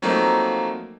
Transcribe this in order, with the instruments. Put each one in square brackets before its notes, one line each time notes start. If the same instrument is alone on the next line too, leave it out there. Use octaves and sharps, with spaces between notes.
[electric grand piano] F3 F#3 A3 A#3 C4 D#4